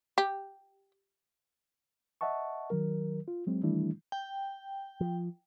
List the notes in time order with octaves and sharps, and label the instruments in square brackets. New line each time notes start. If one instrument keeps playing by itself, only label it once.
[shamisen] G4
[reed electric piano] D#5 E5 F#5 A5 C#6
D#3 F#3 A#4
F4
F#3 G#3 C4
D#3 E3 G3 A3 D4 E4
[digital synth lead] G5
[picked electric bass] F3